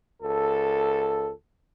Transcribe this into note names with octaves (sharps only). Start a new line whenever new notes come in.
C#2 A4